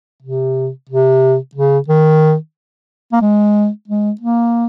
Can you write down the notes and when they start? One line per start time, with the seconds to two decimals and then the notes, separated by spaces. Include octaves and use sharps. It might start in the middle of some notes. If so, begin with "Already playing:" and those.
0.22 C3
0.89 C3
1.55 C#3
1.88 D#3
3.13 A#3
3.22 G#3
3.88 G#3
4.21 A#3